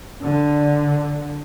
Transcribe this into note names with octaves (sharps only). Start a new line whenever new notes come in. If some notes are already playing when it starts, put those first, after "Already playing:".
D3